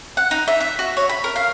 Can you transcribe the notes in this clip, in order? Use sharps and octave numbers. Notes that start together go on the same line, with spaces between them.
F#5
D#4
E5
E5
F#4
C#5
B5
A#4
F5